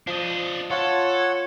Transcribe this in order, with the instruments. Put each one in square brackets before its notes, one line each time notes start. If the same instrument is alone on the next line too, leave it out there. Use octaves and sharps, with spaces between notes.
[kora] F3 [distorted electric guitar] D4 D#5
[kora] F4 [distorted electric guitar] A4 [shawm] C#5 [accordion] F#5